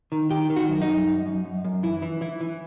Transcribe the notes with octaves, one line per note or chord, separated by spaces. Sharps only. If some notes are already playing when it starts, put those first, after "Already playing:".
D#3
D#3 G4
D#3
F#4
F#2
D#4
F#2
F#2
F#2
F#2
F#2
E3 E4
E3
E3 E4
E3